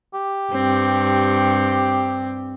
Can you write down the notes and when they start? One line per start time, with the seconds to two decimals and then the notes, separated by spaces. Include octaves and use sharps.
0.14 G4
0.53 G2 C4